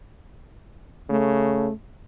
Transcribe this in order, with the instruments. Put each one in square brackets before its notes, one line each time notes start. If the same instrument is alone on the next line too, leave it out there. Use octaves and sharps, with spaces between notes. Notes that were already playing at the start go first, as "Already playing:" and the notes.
[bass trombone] C#3 [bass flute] A3